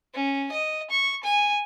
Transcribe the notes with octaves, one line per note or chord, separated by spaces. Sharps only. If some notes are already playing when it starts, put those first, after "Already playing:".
C#4
D#5
C#6
G#5